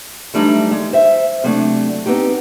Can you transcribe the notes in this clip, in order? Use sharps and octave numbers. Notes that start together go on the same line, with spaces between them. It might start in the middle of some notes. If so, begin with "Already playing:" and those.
E3 F#3 G3 A3 D4 D#4
G#3
C5 E5
C3 F#3 A3 D4
B3 C4 D#4 G4